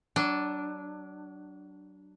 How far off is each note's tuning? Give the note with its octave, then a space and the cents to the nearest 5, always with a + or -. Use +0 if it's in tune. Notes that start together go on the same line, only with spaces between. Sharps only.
F#3 +30 D4 +0